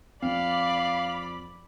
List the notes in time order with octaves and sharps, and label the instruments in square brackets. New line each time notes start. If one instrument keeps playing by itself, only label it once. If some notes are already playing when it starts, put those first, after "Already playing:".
[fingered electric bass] F2 C4 [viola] D5 B5 [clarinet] F5